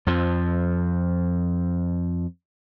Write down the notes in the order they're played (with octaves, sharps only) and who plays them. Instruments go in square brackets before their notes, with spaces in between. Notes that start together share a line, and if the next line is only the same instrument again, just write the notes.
[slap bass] F2 F3